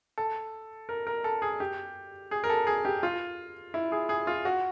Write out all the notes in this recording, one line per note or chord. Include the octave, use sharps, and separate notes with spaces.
A4
A#4
A#4
A4
G#4
G4
G#4
A#4
A4
G#4
G4
F4
E4
G#4
G#4
F4
F#4